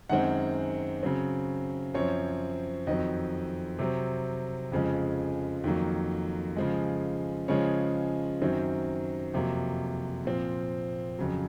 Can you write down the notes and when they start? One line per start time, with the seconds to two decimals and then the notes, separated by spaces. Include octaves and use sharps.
0.10 F#2 D#3 G#3 C4 F#5
1.03 C#3 F#3 C4
1.94 F#2 F3 C4 C#5
2.87 F2 D#3 F#3 C4 D#5
3.79 C3 F#3 C4
4.72 F2 C#3 F3 G#3
5.64 F2 D#3 F#3 A#3
6.56 C#3 F3 G#3
7.48 C#3 F3 G#3 C#5
8.41 F#2 D#3 F#3 C4
9.34 F2 C3 F#3 A#3
10.25 A#2 F3 C4
11.19 F2 C#3 F#3